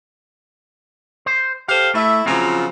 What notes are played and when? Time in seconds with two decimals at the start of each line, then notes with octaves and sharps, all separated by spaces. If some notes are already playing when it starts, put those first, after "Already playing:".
1.26 C5
1.68 G4 A4 C5 F5
1.94 A3 E4 E5
2.26 C#3 F3 F#3 C4 F4 A#5